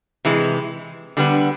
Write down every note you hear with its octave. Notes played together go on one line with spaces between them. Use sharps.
C3 E3 G#3
D3 G3 B3